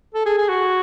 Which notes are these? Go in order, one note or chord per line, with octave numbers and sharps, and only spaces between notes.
A4
G#4
G#4
F#4